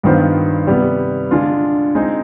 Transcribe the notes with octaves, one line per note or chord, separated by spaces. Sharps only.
G2 D#3 B3 F4 C5
C3 G3 B3
D3 G#3 D4 F4
G#3 C4 D#4